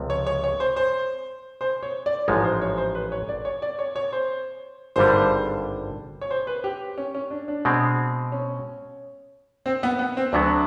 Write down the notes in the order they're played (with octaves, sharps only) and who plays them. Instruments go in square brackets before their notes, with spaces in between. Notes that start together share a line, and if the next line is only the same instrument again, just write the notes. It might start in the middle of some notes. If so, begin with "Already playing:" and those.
Already playing: [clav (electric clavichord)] C#2 C3 F3
[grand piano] C#5
C#5
C#5
C5
C5
C5
C#5
D5
[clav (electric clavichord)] A1 G#2 F3 G#3 [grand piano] C#5
[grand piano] C5
C#5
C5
B4
C#5
D5
C#5
D5
C#5
C#5
C5
[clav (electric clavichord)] G#1 G2 D3 G3 [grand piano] C5
[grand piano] C#5
C5
B4
G4
C#4
C#4
D4
D4
[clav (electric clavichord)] B2 G#3 C4
[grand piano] C#4
C4
B3
B3
C4
[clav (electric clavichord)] D2 D3 F#3 B3 [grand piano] D4